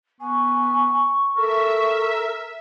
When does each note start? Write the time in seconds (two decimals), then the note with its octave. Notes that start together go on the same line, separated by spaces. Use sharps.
0.20 B3 G#5 C#6
1.37 A4 A#4 E5